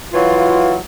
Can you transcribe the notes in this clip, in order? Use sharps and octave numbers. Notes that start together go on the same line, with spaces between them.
E3 F#3 F4